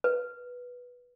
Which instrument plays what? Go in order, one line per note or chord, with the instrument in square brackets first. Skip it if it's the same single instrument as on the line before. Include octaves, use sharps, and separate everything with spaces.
[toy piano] B4